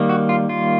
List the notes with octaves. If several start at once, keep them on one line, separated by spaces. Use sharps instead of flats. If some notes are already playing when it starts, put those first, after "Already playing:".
Already playing: D#3 G3 A#3
F#4
F4
F4